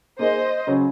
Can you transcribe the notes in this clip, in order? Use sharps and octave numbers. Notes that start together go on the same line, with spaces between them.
A#3 D#4 G#4 C5 D#5
C#3 F#3 C#4